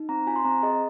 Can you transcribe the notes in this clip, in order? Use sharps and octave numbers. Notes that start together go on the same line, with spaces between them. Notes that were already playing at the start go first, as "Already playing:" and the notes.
Already playing: D#4
C4 A#5
F4 G#5
C6
C4 A#5
G#4 D#5